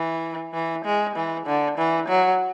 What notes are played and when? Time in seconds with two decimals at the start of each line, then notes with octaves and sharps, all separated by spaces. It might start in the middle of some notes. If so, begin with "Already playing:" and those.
Already playing: E3
0.54 E3
0.85 G#3
1.16 E3
1.46 D3
1.78 E3
2.09 F#3